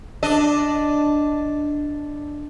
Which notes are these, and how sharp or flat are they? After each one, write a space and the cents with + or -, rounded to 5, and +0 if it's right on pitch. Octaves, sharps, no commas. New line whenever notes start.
D4 +0 D#5 +0